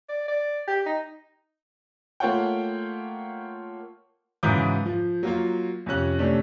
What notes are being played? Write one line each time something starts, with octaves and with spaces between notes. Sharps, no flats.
D5
D5
G4
D#4
A3 A#3 F4 C#5 F#5 G5
G#2 C#3 E3 F#3 D6 G6
F3
F#3 A#3 F4
F2 C3 C#4 F#6
C3 A3 C#4 D4